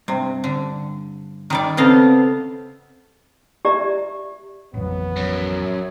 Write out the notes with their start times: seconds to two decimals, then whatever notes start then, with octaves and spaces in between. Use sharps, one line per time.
0.08 G2 C3
0.44 D3
1.50 D#3 G3 D5
1.77 C#3 B3 C4 A4 D#5 F5
3.65 G4 D5 E5 A#5
4.74 A1 F2 F#3 B3
5.16 F#2 C#5